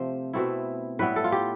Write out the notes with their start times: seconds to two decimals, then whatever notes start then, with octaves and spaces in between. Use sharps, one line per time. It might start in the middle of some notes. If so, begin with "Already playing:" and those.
Already playing: C3 F3 A3 C5
0.33 B2 A3 C4 E4
0.99 A2 G3 B3 E4 B4
1.16 A4
1.24 F4
1.32 G4